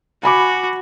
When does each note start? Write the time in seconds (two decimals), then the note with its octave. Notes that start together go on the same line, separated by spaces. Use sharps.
0.23 F#4 G#5 B5 D6